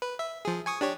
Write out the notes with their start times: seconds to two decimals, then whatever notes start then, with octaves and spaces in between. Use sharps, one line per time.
0.02 B4
0.19 E5
0.45 F3 G#4
0.66 G#5 C#6 D#6
0.81 D4 G4 C#5